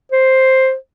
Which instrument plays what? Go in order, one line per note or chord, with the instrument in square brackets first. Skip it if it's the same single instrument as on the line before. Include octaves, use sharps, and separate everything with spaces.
[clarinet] C5